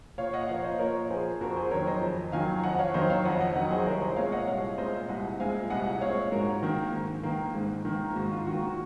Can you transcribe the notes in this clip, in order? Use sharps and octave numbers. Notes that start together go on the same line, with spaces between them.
A#2 C#5 F5
D#5 F#5
F3 A#3 C#5 F5
C5 D#5
A#2 A#4 C#5
F3 A#3 G#4 C5
F2 F#4 A#4
G#4 C5
D#3 F#3 A#4 C#5
C5 D#5
F2
D#3 F#3 F5 G#5
F2 D#5 F#5
F#5
C#5 F5
D#3 F#3 C5 D#5
C#5 F5
F2 D#5 F#5
D#5 F#5
D#3 F#3 D#5 F#5
G#4 C5
C2 A#4 C#5
C5 D#5
A#2 G#3 C4 C#5 F5
D#5 F#5
C2 C#5 F5
A#2 G#3 C4 C5 D#5
C2 D#5 F#5
A#2 G#3 C4 F5 G#5
C2 D#5 F#5
A#2 G#3 C4 C#5 F5
G#2 F#4 A#4
D#3 A#3
G#2
D#3 A#3
G#2
D#3 A#3
G#2 F#4
F4
D#3 A#3 F#4
F#4